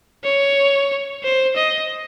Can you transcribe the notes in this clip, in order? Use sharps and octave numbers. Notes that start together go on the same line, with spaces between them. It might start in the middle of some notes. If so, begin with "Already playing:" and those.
C#5
C5
D#5